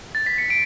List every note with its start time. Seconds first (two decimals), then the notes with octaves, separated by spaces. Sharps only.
0.15 A6
0.26 B6
0.38 C#7
0.50 D7